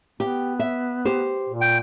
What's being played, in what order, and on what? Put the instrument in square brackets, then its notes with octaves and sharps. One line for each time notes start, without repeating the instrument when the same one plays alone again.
[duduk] B3 [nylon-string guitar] G4
[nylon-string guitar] E5
G4 C5
[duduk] A#2
[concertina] G5